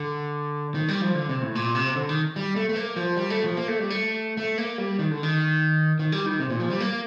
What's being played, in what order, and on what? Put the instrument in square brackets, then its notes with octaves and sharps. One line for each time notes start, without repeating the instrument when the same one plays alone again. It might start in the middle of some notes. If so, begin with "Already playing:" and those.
Already playing: [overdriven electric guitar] D3
D#3
G3
F3
D3
C3
A2
A#2
C3
D3
D#3
G3
A3
A3
A#3
F3
G3
A3
F3
A#3
A3
G3
A3
A3
A#3
G3
D#3
D3
D#3
D#3
G3
D#3
C3
A#2
F3
G3
A#3